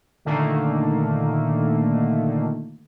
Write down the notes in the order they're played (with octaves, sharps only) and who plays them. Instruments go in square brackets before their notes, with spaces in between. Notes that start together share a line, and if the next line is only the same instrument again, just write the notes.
[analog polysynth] A#2 D3 D#3 A3 A#3